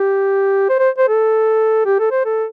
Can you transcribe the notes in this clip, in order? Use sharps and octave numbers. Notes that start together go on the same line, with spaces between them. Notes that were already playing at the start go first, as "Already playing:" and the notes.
Already playing: G4
C5
C5
C5
A4
G4
A4
C5
A4